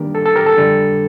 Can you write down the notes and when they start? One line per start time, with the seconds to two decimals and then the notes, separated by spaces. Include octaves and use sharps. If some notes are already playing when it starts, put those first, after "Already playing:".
Already playing: D#3 G3 A#3 D4 G4 A#4
0.15 A4
0.25 A4
0.36 G4 A#4
0.46 A4
0.57 F2 D3 G3 D4